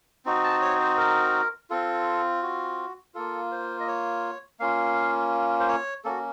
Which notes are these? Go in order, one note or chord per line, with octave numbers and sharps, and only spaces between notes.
C4 D#4 F#4
A5
C#5
C5
A#4
C4 F4 A4
F#4
A#3 F4 A4
C5
D#5
C#5
A#3 C#4 F4 F5
C5
C#5
A#3 C#4 F#4 A4